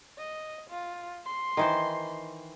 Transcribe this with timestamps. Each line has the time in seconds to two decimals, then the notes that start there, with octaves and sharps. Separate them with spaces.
0.18 D#5
0.70 F4
1.25 C6
1.57 D#3 E3 C5